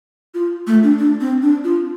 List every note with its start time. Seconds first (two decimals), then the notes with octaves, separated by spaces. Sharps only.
0.34 F4
0.67 A3
0.83 D4
0.98 D4
1.21 C4
1.42 D4
1.64 F4